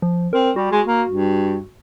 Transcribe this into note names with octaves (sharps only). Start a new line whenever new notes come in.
F3
C4 A#4
G3 F#4
G#3
A#3
G2